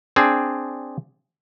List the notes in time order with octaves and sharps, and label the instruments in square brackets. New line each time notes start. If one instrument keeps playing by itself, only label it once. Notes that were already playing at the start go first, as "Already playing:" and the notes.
[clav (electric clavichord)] C4 D4 G#4